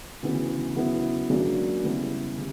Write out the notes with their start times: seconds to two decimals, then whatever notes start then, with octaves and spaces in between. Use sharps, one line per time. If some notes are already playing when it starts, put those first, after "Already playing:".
0.23 D2 C#3 E3 B3
0.76 C#3 F#3 B3 E4
1.29 C#2 C#3 F#3 A#3 D4
1.84 C#3 G3 B3 E4 G4
2.37 C#3